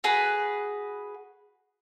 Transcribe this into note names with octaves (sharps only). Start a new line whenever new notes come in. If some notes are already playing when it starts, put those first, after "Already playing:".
F#4 G#4 B4 B5